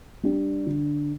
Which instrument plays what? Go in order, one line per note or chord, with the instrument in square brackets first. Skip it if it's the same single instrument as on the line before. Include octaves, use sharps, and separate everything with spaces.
[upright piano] G3 D4 G4
D3